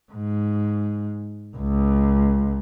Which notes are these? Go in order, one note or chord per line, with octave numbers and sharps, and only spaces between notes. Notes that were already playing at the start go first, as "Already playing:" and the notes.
G#2
C#2